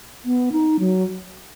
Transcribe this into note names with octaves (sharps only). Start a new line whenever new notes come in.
B3
D#4
F#3